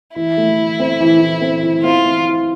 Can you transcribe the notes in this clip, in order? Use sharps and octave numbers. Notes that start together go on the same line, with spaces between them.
E3 E4
A3
E3
C4
E3
E3
C4
E3
C4 F4
C4
E3